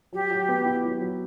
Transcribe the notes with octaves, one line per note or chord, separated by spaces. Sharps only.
F#3 G4
F#3
B3
E4
F#3
F#3